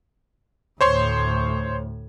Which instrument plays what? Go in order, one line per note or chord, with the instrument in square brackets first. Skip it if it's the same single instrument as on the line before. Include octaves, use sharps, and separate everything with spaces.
[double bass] D2 A2 [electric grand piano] C5 C#5 C6